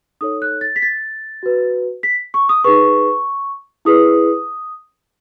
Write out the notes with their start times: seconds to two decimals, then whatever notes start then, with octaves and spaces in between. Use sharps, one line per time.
0.21 D#4 A4 C#5 D#6
0.42 F#6
0.61 A6
0.76 B6
0.82 A6
1.43 F#4 B4
2.03 B6
2.34 C#6
2.49 D#6
2.64 D#4 G#4 B4 C#6
3.85 E4 G#4 B4 D#6